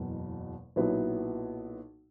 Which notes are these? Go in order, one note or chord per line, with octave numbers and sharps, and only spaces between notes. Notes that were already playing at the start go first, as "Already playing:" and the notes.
Already playing: F#1 E2 B2 F#3
B1 A#2 F#3 B3 E4